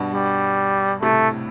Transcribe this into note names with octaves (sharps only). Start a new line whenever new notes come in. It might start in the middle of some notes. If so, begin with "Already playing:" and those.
Already playing: G2 B2
G3
A2 C3 A3